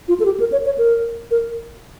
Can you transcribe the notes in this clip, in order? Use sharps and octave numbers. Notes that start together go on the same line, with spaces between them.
F4
A4
G4
A#4
C#5
C#5
A#4
A#4